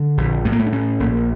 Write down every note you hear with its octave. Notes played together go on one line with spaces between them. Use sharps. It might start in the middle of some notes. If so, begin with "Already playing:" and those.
Already playing: D3
A#1
A2 A3
A#3
A3
D4
A2 C#4
A#1 A#3